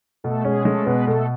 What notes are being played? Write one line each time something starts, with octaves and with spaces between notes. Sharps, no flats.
B2 A3 A4
G#3 C#4 G#4
G#3 A3 A4
B2 B3 B4
B2 A3 A4